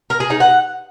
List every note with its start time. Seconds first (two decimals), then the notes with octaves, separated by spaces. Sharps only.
0.10 A#4
0.20 G#4
0.30 D#4
0.40 F#5